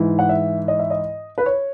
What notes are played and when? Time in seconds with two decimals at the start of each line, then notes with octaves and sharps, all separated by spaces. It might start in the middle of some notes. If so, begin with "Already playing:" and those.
Already playing: G#2 E3
0.19 F#5
0.29 E5
0.68 D#5
0.79 E5
0.90 D#5
1.38 B4
1.46 C#5